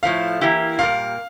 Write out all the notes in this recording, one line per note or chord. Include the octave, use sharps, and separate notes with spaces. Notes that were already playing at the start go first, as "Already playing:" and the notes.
A2 F3 A3 F5
E3 A#3 E4 G4
A#2 G3 A#3 F5